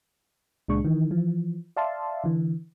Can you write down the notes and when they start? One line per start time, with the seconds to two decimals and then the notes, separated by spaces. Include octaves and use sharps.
0.68 C#2 A#2 G#3 D4 C#6
0.85 D#3 E3
1.11 E3 F3
1.77 D5 E5 F5 A5 C6
2.24 D3 E3